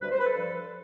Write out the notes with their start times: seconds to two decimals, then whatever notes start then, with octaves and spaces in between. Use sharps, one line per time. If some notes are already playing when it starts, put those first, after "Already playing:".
0.01 D2 C3 G3 B4
0.10 C5
0.18 B4
0.26 A4
0.35 G2 F3